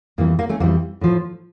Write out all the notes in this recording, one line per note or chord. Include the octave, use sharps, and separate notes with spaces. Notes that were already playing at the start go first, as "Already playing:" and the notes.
F2 E3 G3 A#3
A#3
A3 C#4
F2 E3 G3 A#3
A2 F3